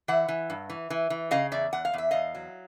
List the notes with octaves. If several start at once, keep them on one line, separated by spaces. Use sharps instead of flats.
E3 E5 F#5
E3
G2
E3
E3
E3
C#3 D#5 F5
E2 D5 E5
E2 F#5
F5
E2 E5
E2 D#5 F5
F#3